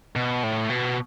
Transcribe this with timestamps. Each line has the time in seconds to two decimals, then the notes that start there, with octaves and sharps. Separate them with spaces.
0.16 B2
0.43 A2
0.70 B2